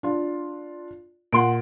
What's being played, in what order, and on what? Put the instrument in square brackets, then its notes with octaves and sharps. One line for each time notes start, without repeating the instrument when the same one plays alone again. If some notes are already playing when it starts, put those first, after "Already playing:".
[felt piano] D4 F4
[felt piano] A#2 [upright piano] F#5 C6 D7